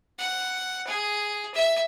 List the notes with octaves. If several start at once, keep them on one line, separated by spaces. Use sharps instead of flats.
F#5
G#4
E5